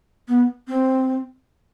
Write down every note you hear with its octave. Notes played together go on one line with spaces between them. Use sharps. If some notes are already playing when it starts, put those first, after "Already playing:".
B3
C4